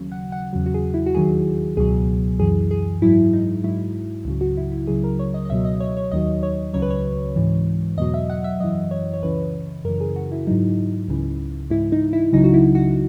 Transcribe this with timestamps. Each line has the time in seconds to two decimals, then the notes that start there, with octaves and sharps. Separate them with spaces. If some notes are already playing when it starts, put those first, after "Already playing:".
Already playing: D#2 C#3 F#3
0.12 F#5
0.32 F#5
0.53 E2 C#3 F#3
0.66 F#4
0.74 G#4
0.94 E4
1.06 F#4
1.15 D#2 D#3 F#3 G#4
1.77 C#2 B2 F#3 G#4
2.40 F#2 E3 G#4
2.71 G#4
3.02 G#2 F#3 E4
3.33 D#4
3.64 G#2 F#3 E4
4.25 C#2 C#3 F#3
4.41 F#4
4.57 E4
4.72 E4
4.88 C#2 C#3 F#3 G#4
5.04 A#4
5.19 C#5
5.34 D#5
5.45 D#5
5.50 C#2 B2 F#3 E5
5.65 D#5
5.80 C#5
5.97 C#5
6.12 D#2 D#3 F#3 D#5
6.43 C#5
6.74 C#2 C#3 F#3 C#5
6.82 B4
6.91 C#5
7.36 G#2 E3
7.98 E2 B2 F#3 D#5
8.14 E5
8.30 F#5
8.44 E5
8.60 F#2 E3 D#5
8.91 C#5
9.14 C#5
9.22 C#2 C#3 E3 B4
9.85 F#2 C#3 E3 A#4
10.01 G#4
10.16 F#4
10.32 E4
10.47 G#2 F#3 D#4
11.08 C#2 C#3 E3
11.70 G#2 E3 E4
11.92 D#4
12.13 E4
12.32 C#2 C#3 F#3 D#4
12.44 F#4
12.54 E4
12.75 F#4